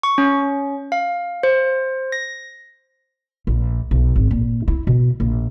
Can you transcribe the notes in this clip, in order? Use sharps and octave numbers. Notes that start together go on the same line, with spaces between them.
C#6
C#4
F5
C5
A#6
A#1
B1
G#1
A#2
E4
B2
A#1